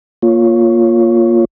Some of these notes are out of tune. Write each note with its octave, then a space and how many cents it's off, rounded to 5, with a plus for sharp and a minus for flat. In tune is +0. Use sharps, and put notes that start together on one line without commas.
A#3 +10 F4 +0 C#5 +0